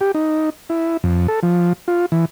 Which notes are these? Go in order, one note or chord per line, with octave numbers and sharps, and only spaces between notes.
G4
D#4
E4
F2
A4
F3
F4
E3